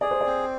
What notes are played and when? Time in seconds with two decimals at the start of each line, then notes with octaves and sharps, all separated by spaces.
0.01 G#4 D5
0.11 C5
0.21 C4 D5